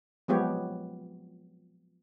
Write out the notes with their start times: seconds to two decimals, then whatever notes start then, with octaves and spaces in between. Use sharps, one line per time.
0.28 F3 F#3 G#3 B3 G4 C#5